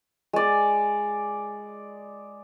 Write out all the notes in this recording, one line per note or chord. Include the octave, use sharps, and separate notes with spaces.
G#3 D5